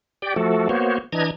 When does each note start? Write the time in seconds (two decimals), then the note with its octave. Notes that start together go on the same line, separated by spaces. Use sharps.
0.22 G4 D5 G5
0.36 F3 A3 F#4 A4
0.69 A#3 B3 F#4 C5 C#5
1.12 E3 D4 D#5 A#5 G#6